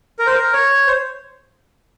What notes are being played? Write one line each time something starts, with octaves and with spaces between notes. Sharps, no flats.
A#4
C5
A#4
C#5
C5